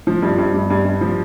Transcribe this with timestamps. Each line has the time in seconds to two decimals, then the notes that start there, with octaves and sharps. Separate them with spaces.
0.07 F3
0.22 G2
0.38 G2
0.54 G2
0.70 G2
0.85 G2
1.01 F3